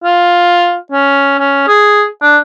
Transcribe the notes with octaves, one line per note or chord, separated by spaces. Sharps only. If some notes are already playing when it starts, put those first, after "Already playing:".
F4
C#4
C#4
G#4
D4